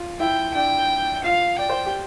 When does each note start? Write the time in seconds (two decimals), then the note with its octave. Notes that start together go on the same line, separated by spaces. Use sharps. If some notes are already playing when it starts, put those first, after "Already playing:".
Already playing: F4
0.20 E4 G5
0.55 D4 G5
1.24 F4 F5
1.58 D5 G5
1.70 C5
1.86 G4